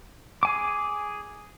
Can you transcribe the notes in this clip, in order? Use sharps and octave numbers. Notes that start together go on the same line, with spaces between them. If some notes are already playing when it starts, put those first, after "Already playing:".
G#4 G#5 D6